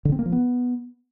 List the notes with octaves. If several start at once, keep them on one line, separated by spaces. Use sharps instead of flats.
D3
C4
A#3
F3
B3